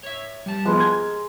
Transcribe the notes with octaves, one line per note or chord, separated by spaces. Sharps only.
C#5 E5
G3 A5
F3 G#3 B3
A#4 G#6